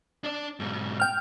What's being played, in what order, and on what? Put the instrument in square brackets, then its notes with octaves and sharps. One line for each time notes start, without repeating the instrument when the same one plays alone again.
[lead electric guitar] D4 D5
G#2 B2
[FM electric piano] G5 F6